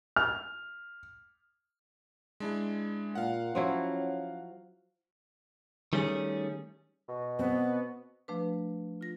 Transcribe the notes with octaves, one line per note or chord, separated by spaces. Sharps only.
F6
G#3 D4 E4
A#2 F5 F#5
F3 F#3 C#4 E4
D#3 G3 A3 C#4 F#4 G#4
B2
B3 C4
F3 A3 D4 B4
F4 A#6